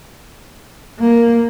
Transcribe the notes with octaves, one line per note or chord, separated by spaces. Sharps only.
A#3